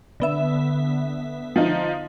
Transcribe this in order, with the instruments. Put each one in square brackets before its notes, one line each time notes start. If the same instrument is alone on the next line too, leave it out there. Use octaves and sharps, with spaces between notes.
[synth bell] D3 B3 E5
[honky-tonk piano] F3 D#4